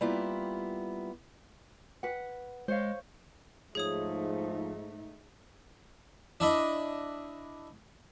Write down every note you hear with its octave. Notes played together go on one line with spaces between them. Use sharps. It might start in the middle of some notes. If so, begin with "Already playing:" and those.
G3 A#3 B3 E4 F4 G4
B4 F#5
G#3 C5 C#5 F5
G#2 F3 A3 D#4 G#4 C#5 D#6
D4 E4 D#5